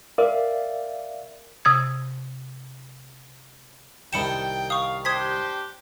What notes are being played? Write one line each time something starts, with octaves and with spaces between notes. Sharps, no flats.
A#4 D5 E5 F5
C3 D#6 G#6
C2 D#3 G5 A5 B5 C#7 E7
F5 C#6 D#6
D4 G4 C5 D#6 G#6 B6